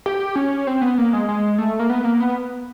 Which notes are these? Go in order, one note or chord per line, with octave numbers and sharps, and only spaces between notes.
G4
C#4
C4
B3
A#3
G#3
G#3
A3
A#3
B3
A#3
B3